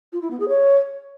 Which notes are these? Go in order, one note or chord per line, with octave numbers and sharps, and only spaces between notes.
F4
E4
B3
G#4
C#5